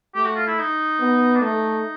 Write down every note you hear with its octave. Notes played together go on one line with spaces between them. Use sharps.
A3 G4
F#4
F4
E4
D#4
B3
D4
A3 D#4